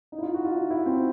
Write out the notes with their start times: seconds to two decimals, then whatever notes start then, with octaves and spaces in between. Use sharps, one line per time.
0.12 D#4
0.18 E4
0.23 F4
0.34 F#4
0.45 F4
0.56 E4
0.71 E4
0.86 C4